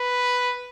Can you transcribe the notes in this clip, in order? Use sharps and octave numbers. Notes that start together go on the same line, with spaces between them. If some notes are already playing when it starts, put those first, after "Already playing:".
Already playing: B4